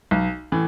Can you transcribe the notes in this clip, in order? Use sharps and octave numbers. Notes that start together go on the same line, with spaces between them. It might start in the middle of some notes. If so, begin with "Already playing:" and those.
B1
A2 E3